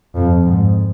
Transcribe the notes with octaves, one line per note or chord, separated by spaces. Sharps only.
F2
G#2